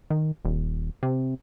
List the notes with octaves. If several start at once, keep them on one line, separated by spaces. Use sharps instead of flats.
D#3
D#1
C3